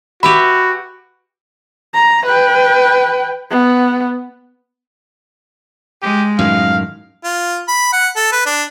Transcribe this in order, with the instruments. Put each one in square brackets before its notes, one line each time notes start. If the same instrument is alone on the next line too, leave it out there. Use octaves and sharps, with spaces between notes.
[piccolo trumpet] F#4 [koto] G4 B4 E5 [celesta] B5
[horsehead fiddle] A#5
B4 G5
B3
[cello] G#3 [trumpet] G4
[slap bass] F#2 A2 D#3 [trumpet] F5
[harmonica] F4
B5
F#5
A4
B4
D4